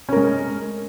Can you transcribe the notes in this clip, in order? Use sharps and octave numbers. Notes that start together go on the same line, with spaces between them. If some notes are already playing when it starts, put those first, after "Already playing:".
G#3 C#4 A#4